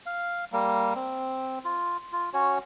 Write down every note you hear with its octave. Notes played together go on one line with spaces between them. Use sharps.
F5
G3 A#3
C4
F4
F4
C#4 F#4 C#5